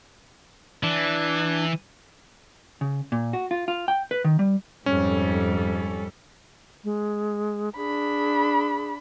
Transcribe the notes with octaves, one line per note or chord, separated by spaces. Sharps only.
E3 D4
C#3
A#2
F#4
F4
F4
G5
B4
D#3
G3
F2 G#2 G3 C#4 A4
G#3
D4 G#4 B5